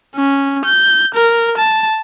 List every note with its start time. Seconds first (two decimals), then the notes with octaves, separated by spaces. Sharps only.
0.16 C#4
0.66 G6
1.15 A#4
1.58 A5